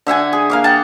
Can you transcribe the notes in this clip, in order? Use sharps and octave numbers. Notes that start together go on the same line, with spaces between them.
D3 E5 F#5 G#5
G#4
A#3 F5 D6
F#5 G5 A5